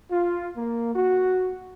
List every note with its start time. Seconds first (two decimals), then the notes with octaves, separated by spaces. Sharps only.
0.10 F4
0.56 A#3
0.95 F#4